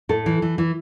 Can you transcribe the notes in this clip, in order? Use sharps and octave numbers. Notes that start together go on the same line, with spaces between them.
A2 A4
E3
E3
E3